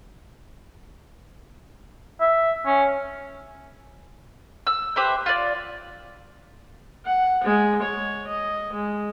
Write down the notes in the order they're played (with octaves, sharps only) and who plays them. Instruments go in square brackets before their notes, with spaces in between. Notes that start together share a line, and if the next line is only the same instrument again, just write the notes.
[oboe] E5
C#4
[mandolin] E6
G4 B4 C5 E5
F4 D5
[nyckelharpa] F#5
G#3
C#5
D#5
G#3